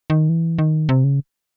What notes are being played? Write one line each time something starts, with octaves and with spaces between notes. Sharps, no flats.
D#3
E3
D#3
C3
C#3